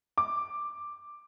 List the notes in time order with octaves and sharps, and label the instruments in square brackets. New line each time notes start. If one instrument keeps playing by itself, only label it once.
[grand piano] D6